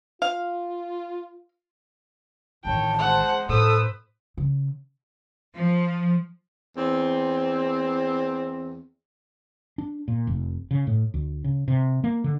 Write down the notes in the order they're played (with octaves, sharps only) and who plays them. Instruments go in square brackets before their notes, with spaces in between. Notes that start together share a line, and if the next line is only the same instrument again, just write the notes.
[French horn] F4 [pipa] F5
[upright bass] A1 D#3 [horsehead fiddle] C#5 G5 [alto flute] A5
[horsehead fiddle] G#3 C5 [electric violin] F#5
[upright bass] A2 [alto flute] A4 [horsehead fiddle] B4 C5 [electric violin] D#6 E6
[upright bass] C#3
[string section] F3
[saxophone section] E2 C4
[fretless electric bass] D4
A#2
F1
C#3
A2
D2
C#3
C3
A#3
D3